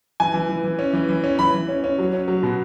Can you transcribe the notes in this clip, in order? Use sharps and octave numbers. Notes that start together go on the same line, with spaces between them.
E3 G#5
E3
E3
E3
C#4
E3
E3
C#4
E3 B5
E3
C#4
C#4
F#3
C#4
F#3
B2